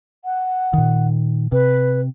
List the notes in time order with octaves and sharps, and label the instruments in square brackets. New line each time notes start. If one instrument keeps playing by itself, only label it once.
[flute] F#5
[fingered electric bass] A#2 D#3
[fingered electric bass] C3 [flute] B4